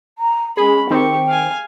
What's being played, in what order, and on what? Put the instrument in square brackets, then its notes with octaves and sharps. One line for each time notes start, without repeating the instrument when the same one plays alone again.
[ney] A#5
[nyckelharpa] G#3 B5 [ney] C#4 [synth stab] G#4
[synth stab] D#3 C4 [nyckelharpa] G4 C#6 [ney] G5
[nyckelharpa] F5 G#5